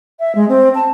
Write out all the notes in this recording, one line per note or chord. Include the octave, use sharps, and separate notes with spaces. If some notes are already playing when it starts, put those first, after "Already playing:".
E5
G#3
C4
A5